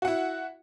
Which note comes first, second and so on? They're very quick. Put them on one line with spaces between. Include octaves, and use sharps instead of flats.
F#4 F#5 E4